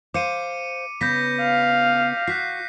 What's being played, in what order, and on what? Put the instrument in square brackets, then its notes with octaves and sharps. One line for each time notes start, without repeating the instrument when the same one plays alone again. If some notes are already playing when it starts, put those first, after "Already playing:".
[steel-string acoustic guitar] C5 F5 [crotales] D6 C#7 D#7
[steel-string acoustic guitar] C#3 B3 [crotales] G6 A#6 B6
[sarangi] F5
[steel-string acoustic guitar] F#4 [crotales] F#6 B6 C7